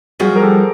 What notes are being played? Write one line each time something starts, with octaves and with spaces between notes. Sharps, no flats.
F3 G3 F#4 G#4
A#4
G4 A4